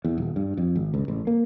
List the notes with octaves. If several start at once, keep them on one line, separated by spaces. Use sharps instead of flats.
E2
D#1
G2
F2
G#1
C#2
A1
A#3